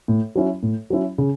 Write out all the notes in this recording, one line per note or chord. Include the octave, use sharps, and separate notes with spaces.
A2
F#3 C#4 E4
A2
F#3 C#4 E4
C#3